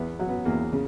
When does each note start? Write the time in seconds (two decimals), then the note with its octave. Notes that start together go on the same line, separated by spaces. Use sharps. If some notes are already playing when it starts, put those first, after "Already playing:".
Already playing: E2 B3
0.19 F#3
0.29 B3
0.45 E2 A#3
0.72 C#3